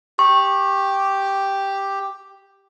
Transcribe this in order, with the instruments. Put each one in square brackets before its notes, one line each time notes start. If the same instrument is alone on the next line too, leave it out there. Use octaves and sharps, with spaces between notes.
[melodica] G4 [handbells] C#6